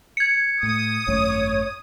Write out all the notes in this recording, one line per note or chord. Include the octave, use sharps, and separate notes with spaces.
G#6 C#7
A2 D#6
G#1 F#2 A3 C#5